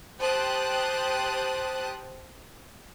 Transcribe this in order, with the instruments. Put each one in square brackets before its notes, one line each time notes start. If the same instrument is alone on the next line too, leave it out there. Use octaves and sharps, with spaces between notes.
[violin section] G4 C5 G5 A5 D#6 F#6